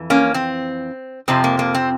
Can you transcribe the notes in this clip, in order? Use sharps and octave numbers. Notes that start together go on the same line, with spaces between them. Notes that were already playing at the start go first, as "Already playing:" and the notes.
Already playing: F2 E3
A#3 C#4
C4
F2 C3 F3 C4
A#3
A#3
C4